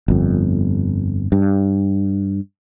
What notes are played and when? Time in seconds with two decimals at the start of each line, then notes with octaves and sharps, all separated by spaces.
0.08 G1 F2
1.32 G2